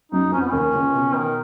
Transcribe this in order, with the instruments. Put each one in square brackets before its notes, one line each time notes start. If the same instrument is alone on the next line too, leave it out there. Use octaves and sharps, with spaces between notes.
[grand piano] F#2 F#3 [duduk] D#4
[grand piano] F2 F3 [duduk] C#4
[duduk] B3
[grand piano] D#2 D#3 [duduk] C#4
[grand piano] C#2 C#3
B2
[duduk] D#3